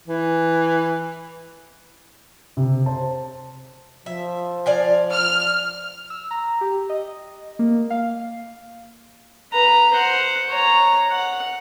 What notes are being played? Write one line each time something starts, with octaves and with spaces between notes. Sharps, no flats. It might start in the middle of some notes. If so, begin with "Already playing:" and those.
E3
C3
C5 A5
F3 E5
D5 F5 G#5
F6
E6
A#5
G4
D#5
A#3
F5
B4 A#5
C5 F#5
C#5 A#5
F#5